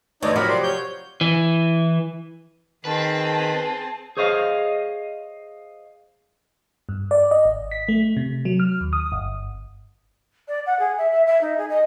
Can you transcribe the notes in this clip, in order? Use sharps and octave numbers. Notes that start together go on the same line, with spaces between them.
D2 G2 E3 D#4 C#5 D5
C3 F3 F#3 A#4 B5
D5 C6
C#5 G6
E3
D#3 C4 G#4 B4 A5
G#4 C5 C#5 D#5 F5
G2
D5
D#5
G#1
B6
A3
C3
F#3
F6
D#2
D#6
G1
D5
F#5
G#4
E5
E5
E5
D#4
G#4
D#5